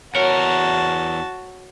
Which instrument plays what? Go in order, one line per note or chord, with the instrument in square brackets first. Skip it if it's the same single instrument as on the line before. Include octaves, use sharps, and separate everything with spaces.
[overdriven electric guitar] E2 A#4 [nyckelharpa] F#4 A5 [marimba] C#5